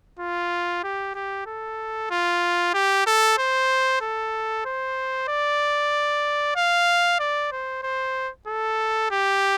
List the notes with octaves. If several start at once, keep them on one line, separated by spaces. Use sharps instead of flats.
F4
G4
G4
A4
F4
G4
A4
C5
A4
C5
D5
F5
D5
C5
C5
A4
G4